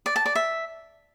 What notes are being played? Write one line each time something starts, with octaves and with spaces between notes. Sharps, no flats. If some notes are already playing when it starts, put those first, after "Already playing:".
D5
A5
D5
E5